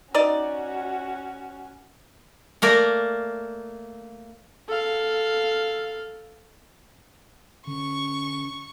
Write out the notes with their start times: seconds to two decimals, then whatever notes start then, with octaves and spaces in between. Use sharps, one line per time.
0.15 C#4 D#4 F#4 D5
2.62 A3 A#3 A#4 D5
4.68 A4 F5
7.67 D3 C#4 C#6